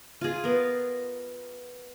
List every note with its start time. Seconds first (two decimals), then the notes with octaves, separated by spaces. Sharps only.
0.21 F4 G#4
0.44 B3 A#4